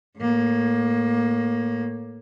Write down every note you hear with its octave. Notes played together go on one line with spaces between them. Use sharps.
A2 A#3